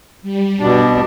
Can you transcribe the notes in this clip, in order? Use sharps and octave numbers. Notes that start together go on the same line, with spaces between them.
G3
B2 D4